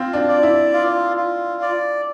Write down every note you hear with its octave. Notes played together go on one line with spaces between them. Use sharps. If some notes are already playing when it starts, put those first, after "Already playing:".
Already playing: C4 F4
D4
D5
E4
F4
F4
D5